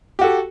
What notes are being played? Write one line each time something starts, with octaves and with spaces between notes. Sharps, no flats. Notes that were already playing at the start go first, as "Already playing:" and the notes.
F#4 G4 A4